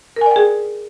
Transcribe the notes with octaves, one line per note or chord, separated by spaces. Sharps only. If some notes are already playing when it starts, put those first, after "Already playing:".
G#4 A#4 D5 G5 G#5